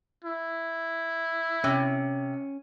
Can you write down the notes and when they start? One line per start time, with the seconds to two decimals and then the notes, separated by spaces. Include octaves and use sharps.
0.24 E4
1.64 C3 C#4